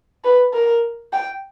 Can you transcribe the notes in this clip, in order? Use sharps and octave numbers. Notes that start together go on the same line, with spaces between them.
B4
A#4
G5